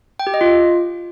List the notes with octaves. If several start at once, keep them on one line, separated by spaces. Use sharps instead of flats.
G5
G4
D#5
F4